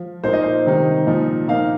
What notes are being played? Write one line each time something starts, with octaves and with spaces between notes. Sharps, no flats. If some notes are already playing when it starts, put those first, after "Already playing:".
Already playing: F3
A#2 A#3 D#4 C5
D#5
C5
C3 D#3 G3 D#4
A#2 F3 D#4
A#2 A#3 D#4 F5